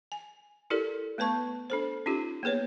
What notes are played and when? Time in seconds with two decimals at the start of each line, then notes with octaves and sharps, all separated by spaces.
0.12 G#5
0.70 E4 G4 A4 A#4 D5
1.18 A3 B3 B4 A5 C#6
1.70 D4 A4 C5
2.06 C#4 D#4 F4 G4
2.43 A#3 B3 G#4 B4 C#5